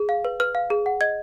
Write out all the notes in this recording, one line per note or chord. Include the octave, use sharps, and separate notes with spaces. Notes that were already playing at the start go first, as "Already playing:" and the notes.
Already playing: G#4
F5
B4
B4 F6
F5
G#4
F#5
D#5 G#6